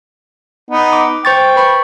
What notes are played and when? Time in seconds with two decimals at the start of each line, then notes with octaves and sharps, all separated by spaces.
0.71 B3 D#4
0.93 D6
1.25 C5 G5 C#6 A6
1.56 B4 B5 C#6